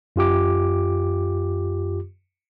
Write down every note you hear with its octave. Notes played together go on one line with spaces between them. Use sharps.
F#2 F4 G4 D6